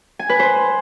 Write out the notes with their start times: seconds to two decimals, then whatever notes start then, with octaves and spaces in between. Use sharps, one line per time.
0.19 G#5
0.29 B4
0.39 C5